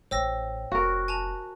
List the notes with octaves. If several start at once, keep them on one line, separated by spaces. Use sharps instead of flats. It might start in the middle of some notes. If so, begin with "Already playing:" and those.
A1 C5 C#5 G5 E6 A#6
F1 F#4 A#4
G#5 A5 F7